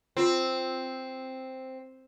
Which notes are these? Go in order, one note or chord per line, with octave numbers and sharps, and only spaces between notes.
C4 F4